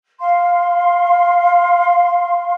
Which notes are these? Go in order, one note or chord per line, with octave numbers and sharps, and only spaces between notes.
F5 C6